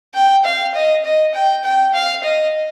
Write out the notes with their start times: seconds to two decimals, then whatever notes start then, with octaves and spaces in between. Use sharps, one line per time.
0.14 G5
0.45 F5
0.74 D#5
1.04 D#5
1.34 G5
1.64 G5
1.94 F5
2.24 D#5